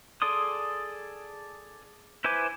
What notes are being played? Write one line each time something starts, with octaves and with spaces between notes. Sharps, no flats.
G#4 A4 D5 C6 D#6
E4 B4 C5 G#5 D6